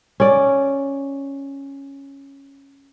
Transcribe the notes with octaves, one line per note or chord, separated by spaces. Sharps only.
C#4 D5